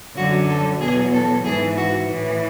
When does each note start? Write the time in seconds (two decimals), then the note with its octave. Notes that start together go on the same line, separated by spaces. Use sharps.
0.16 F#2 D3 F#3 F#4
0.48 A4
0.80 E2 B2 F#3 G#4
1.13 A4
1.44 G#2 E3 G#4
1.76 F#4
2.09 A2 E3